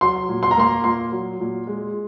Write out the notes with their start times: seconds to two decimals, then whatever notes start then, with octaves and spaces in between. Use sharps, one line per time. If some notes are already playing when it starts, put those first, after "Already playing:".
0.01 F#3 C6
0.29 A#2
0.43 C6
0.51 A#5
0.57 A#3 C6
0.84 A#2 C6
1.12 F#3
1.40 A#2
1.67 G#3